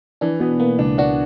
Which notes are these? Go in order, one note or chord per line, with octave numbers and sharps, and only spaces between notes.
E3 D4
B2 B3
A#3 B3
C#2 D4
D4 F#4